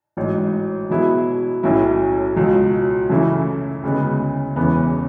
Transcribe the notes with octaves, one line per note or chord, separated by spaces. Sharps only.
A1 G#2 F#3
B2 F#3 B3 E4 G#4
B1 A2 F#3 C#4 E4
C#2 B2 F#3
F#2 C#3 E3 A3 E4
D2 C#3 G#3 B3
E1 E2 C#3 E3 B3